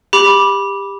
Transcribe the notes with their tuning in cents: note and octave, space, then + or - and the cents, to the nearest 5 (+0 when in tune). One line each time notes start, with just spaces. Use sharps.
G4 +25 B5 -15 D6 +0